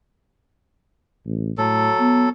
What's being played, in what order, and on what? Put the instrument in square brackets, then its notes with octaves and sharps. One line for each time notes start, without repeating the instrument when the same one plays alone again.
[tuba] A1
[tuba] A2 [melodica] F#3 A4
[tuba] B3